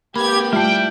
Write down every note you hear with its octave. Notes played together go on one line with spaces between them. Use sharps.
A#3 G4 B4 B5 G#6
G2 A3 E4 F4 G5